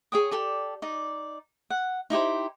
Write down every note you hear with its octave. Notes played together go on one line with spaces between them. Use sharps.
G#4 C#5 G5 D#6
G4 A4 D5
D#4 D5
F#5
D#4 E4 G4 C5